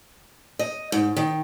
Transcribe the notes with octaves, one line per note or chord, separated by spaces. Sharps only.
D#5
G#2
D#3